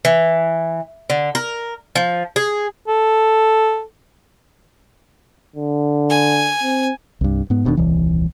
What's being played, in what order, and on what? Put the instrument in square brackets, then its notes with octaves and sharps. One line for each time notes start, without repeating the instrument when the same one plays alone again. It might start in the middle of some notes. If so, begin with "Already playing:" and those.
[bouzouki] E3
D3
A#4
F3
G#4
[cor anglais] A4
[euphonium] D3
[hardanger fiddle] G#5
[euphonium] C4
[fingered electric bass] C2 G2
G#2 B3
E1 B2 D#3 D4
D#1 C2 E3